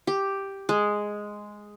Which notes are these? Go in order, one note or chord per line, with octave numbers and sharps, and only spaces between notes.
G4
G#3